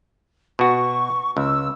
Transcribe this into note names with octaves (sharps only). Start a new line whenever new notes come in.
B2 F#4 C#6
C#2 E6